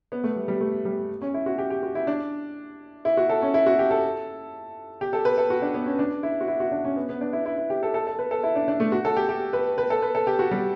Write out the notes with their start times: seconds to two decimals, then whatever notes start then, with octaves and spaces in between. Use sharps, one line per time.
0.12 B3
0.24 A3
0.36 G3
0.48 G3
0.61 A3
0.85 G3
1.22 C#4
1.34 E4
1.46 F#4
1.58 G4
1.70 G4
1.83 F#4
1.95 E4
2.07 D4
3.05 E4
3.17 F#4
3.30 A4
3.42 C#4
3.54 E4
3.66 F#4
3.79 G4
3.90 A4
5.01 G4
5.13 A4
5.25 B4
5.38 A4
5.50 F#4
5.62 D4
5.74 B3
5.86 C#4
5.99 D4
6.23 E4
6.41 F#4
6.48 E4
6.60 F#4
6.71 D4
6.85 C#4
6.96 B3
7.09 B3
7.21 D4
7.33 E4
7.46 E4
7.57 E4
7.70 G4
7.83 A4
7.94 A4
8.07 A4
8.19 B4
8.31 A4
8.43 E4
8.55 D4
8.68 D4
8.80 A3
8.92 F#4
9.05 A4
9.16 G4
9.29 G4
9.53 B4
9.78 B4
9.90 A4
10.02 B4
10.15 A4
10.27 G4
10.39 F#4
10.51 G3